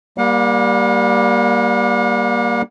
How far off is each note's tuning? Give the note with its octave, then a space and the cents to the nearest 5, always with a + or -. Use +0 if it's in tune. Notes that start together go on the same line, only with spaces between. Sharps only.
G3 +0 A#3 +15 F#5 -45